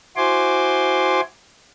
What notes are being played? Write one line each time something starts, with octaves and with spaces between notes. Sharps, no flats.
E4 F#4 C5 G#5 C6 D6